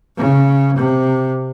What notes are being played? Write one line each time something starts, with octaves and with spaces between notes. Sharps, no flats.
C#3
C3